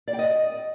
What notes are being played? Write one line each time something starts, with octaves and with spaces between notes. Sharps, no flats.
D5
G5
D#5